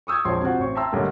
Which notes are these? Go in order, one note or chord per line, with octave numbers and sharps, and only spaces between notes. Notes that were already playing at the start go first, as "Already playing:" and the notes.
C#6 D#6 E6 G6 G#6
E1 A#1 F3 C#4 C6
C3 C4 F4 F#4
A1 C4 C#6
E5 G5 A5 A#5 C6 E6
B1 F#2 D3 G3 A3 A#3